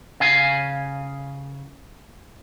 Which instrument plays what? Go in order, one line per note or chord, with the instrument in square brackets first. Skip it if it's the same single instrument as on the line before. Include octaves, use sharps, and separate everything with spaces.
[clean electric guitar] C#3 F5 G#5